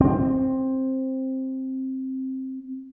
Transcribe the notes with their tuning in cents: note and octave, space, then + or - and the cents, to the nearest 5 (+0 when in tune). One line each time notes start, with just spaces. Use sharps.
C4 +10